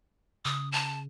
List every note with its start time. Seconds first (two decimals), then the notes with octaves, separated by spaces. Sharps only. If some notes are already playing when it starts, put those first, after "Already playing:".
0.45 C#3 D#6
0.72 A5